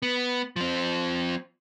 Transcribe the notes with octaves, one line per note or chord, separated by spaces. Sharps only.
B3
F3 C4